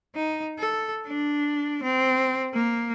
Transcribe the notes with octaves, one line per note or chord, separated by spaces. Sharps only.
D#4
A4
D4
C4
A#3